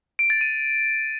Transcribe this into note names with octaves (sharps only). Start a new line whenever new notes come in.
D7
A6
D#7